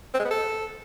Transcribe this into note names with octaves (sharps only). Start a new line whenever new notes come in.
C4
G#3
B3
A4